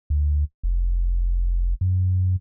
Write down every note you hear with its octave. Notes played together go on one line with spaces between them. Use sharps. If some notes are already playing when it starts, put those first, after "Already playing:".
D2
F1
F#2